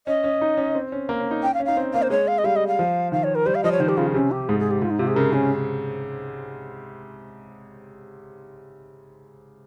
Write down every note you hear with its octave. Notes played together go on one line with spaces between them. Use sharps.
C#4 D#5
C#4
D#4
C#4
C4
C#4
A#3
C#4
D#4
C#4 G5
F5
C#4
D#4 F5
C4
A#3 F5
C5
G#3 C#5
F5
D#5
G3 F5
D#5
F5
F3
D#3 F5
C#5
A#4
G3 C5
F5
F3 D#5
C#5
D#3 C5
G4
C#3 F4
C3 C#4
G4
G#2 G#4
G#4
G4
G#2 F4
D#4
C3 F4
G#4
C#3 A#4
C#4